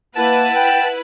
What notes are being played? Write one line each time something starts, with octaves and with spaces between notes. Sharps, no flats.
A#3 E4 B4 F#5 A5 B5
G5